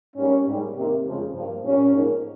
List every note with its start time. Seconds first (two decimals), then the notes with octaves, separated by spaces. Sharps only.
0.16 G#2 G3 A#3 C#4
0.46 G#2 G3 A#3
0.75 C3 D#3 A#3
1.05 F2 C#3 F3 G#3
1.34 G2 F3 A#3
1.64 A#2 G3 A#3 C#4
1.94 G#2 F3 A#3